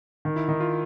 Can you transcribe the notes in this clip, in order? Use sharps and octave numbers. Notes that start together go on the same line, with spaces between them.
D#3
E4
D#3 D#4
F4